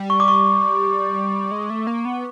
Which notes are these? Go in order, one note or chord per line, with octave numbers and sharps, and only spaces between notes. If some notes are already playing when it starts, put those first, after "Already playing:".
Already playing: G3
C#6
D6
C#6
G#3
A3
A#3
B3